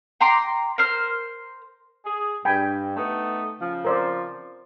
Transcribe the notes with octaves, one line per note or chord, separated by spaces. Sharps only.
G5 A#5 C6 D6
A#4 C5 F6
G#4
G2 G5 G#5 B5
A3 B3 D#4
C#3 F3
A#4 C5 D5